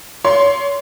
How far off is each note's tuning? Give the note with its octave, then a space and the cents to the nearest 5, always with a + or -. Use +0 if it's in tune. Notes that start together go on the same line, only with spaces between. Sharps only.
C#5 +30 C6 -10